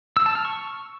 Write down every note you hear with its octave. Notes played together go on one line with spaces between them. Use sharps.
E6
A5
F6
C#6